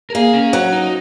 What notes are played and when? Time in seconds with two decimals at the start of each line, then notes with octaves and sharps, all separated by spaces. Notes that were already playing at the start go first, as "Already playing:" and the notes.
0.10 A#4
0.15 A#3 G#4
0.34 C#4
0.53 F#3
0.72 D#4